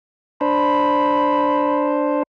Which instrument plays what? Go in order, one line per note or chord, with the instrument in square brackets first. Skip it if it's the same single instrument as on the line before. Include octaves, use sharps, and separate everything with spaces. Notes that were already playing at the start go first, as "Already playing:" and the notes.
[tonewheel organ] D4 C5 [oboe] B5